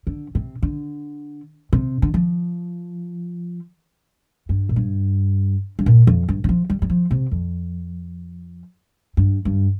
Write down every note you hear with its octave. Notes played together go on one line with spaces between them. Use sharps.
D3
C3
D3
C3
D3
F3
G2
A#2
G2
G2
A#2
F2
G2
D3
F3
G3
G3
F3
C3
F2
G2
G2